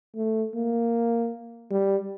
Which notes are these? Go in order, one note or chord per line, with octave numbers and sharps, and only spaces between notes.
A3
A#3
G3